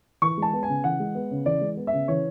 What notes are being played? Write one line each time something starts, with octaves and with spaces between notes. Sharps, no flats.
E3 C#6
G#3 A5
B3
G#5
C#3
E3 F#5
G#3
B3
C#3
E3 D5
G#3
B3
E5
C#3
E3 C#5